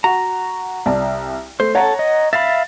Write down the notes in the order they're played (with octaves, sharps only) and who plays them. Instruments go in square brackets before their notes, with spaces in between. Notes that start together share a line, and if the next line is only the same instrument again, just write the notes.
[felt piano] F#4 [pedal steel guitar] A#5
[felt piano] C2 D5 A5
[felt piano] A3 [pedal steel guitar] C5
[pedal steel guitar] A4 [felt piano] C#5 F#5 A#5
[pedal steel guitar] D#5
[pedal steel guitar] E5 F5 B5 [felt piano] A6